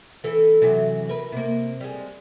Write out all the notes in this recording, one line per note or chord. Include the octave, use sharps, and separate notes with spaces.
E3 A4
C3 E3 F#3
A#4 B4
C3 A#3
G3 G#3